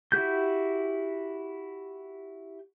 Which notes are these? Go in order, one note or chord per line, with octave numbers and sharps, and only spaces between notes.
E4 F#4 G4 G6